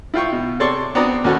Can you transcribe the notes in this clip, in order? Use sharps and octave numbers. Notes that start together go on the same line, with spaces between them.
E4 F4 G5 C#6
B2
C3 A4 C#5 D5 C6 C#6
B3 C4 D4 A#5 D6 D#6
D#2 C#4 F#4 A4 B4 C#5